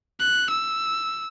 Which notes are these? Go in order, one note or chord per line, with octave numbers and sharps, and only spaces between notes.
F#6
E6